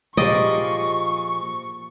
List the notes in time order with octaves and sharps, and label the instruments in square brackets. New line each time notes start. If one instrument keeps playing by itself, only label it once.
[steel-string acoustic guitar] A#2 F3 G#4 [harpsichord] A#3 G4 D5 [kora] D#5 [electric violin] C#6